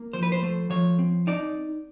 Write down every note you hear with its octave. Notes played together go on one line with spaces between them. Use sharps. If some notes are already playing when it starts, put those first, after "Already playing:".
Already playing: A#3
F3 C5
B4
C5
A3
F3 C#5
C4
D#4 D5